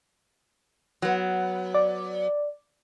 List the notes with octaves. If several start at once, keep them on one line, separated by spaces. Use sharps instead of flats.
F#3 B3
D5